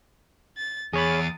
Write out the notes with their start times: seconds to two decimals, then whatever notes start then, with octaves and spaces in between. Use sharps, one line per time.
0.57 A6
0.93 E2 G#4 C#5 B5 D#6 A6